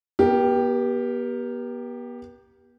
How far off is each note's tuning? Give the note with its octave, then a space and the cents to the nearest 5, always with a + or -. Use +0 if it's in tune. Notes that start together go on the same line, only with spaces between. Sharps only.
B3 -40 G4 +0 A#4 +0